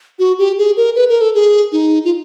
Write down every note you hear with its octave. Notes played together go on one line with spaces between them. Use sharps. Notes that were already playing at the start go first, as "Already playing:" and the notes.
F#4
G4
G#4
A#4
B4
A#4
A4
G#4
D#4
F4